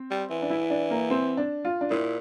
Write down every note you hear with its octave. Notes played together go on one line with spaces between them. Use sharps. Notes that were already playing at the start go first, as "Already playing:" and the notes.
Already playing: C4
G3
E3
D4
E4
D4
A#3
C4
D4
F4
D4
A#2 E4